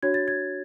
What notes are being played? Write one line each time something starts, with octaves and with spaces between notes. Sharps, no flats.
D4 F#4 C#5 G#6
A6
G#6